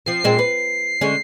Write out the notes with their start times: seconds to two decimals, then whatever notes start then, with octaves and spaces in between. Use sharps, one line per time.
0.06 F3 C4 C7
0.24 A#2 G#3 C4
0.39 B4
1.01 D3 G#3 C#4